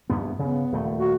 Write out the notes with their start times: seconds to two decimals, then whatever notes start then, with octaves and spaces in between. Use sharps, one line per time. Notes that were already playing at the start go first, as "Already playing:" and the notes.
0.10 D2 G2 B3
0.39 C#3 B3
0.72 D#1 A3
0.98 F#4